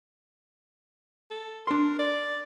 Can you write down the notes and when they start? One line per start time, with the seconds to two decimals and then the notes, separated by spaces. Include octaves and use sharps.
1.31 A4
1.67 D4 A#4 C6
1.99 D5